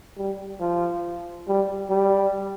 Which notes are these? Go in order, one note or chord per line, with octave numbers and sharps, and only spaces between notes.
G3
F3
G3
G3